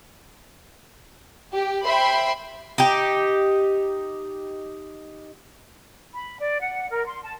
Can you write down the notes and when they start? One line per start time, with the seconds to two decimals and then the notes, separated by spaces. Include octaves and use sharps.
1.53 G4
1.86 C5 E5 G5 B5 C6
2.78 D#4 G4
6.14 B5
6.40 D5
6.60 F#5
6.91 A#4
7.06 C6
7.24 A5